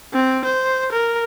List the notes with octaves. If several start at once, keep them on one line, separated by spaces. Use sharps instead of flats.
C4
C5
A#4